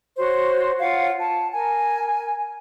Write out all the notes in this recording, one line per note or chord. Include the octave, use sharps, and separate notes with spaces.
F#4 C5 C#5
F4 C#5 F5 F#5
A5
A#4 G#5